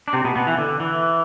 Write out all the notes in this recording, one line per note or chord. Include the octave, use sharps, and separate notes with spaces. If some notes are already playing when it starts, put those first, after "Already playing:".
D4
C3 C4
B2 B3
B2 B3
E3
D3
E3